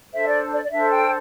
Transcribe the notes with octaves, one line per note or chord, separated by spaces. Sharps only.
D4 A4 C5 E5
D5
D5
D5
D4 A4 C5 E5
G5